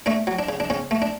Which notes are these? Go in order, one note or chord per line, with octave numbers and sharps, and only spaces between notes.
A3 D4
F#3
D4
C#3
D4
C#3 C#4
A3
D4